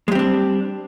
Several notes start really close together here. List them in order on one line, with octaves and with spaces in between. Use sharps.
G#3 G3 C4 D4